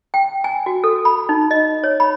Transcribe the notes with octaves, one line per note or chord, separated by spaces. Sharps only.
G5
G#5
F#4
A4
B5
D#4
D#5
C#5
B5